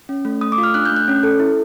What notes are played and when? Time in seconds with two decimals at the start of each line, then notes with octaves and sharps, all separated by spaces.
0.09 C#4
0.25 A3
0.41 A3 D#6
0.52 D6
0.58 F4
0.63 F6
0.74 D4 F#6
0.86 G6
0.91 A3
0.96 F#6
1.08 C#4
1.23 A4
1.40 E4